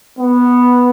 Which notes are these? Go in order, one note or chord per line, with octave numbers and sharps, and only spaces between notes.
B3